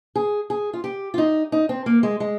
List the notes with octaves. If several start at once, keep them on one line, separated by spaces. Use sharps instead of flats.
G#4
G#4
F4
G4
F4
D#4
D#4
C4
A#3
G#3
G#3